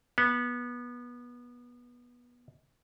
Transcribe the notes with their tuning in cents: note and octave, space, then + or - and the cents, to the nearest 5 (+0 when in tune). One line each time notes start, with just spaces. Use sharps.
B3 -20